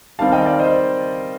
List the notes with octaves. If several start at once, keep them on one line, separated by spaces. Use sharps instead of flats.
D#3 G3 C4 F5 A5
D#5 G5
D5 F5
C5 D#5